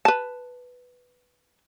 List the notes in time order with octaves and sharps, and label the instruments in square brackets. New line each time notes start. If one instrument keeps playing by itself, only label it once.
[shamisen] B4 A5